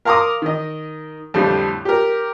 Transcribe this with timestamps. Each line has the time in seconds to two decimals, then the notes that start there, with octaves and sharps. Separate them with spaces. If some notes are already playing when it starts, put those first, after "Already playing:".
0.05 A#4 F5 A#5 C6 D6 D#6
0.42 D#3 D#5
1.34 F2 A2 D3 G3
1.85 G4 A#4